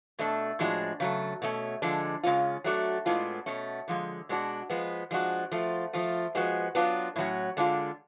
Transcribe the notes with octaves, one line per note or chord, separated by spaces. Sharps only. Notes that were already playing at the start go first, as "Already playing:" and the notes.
B2 A3 D4
A2 F3 G#3 D4 F#4
C#3 F#3 A3
B2 A3 C#4
D3 F3 G#3 D4
C#3 G#3 C#4 F4
F#3 A3 D4 F#4
A2 G#3 B3 D4 F4
B2 A3 C#4
D3 F3 G#3
B2 G#3 D4 F#4
F3 G#3 B3
F3 G#3 D4 F#4
F3 A3 F4
F3 A3 F4
F3 G#3 B3 F#4
F#3 B3 D4 F4
A2 F#3 C#4 F#4
D3 G#3 D4 F4